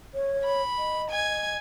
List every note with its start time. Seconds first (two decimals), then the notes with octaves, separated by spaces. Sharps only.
0.14 C#5
0.44 B5
0.78 D#5
1.11 G#5 G#6